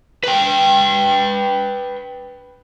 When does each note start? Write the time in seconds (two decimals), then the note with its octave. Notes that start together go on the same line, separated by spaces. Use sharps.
0.24 B4 G5